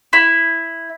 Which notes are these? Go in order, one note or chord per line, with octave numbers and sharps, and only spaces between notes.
E4